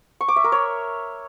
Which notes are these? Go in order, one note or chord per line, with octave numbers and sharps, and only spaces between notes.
C#6
D6
E5
A#4
C#5